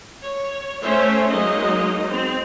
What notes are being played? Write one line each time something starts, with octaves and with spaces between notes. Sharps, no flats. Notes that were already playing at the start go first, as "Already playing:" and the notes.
C#5
A3 C#4 C5 C#5 E5
F#3 G#3 A#3 D#4 D#5
C4